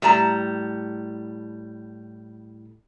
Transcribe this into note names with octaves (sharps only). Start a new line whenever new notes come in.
A2 G3 A5 A#5